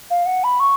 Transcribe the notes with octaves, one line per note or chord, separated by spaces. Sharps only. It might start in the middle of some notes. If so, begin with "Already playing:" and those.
F5
F#5
B5
C#6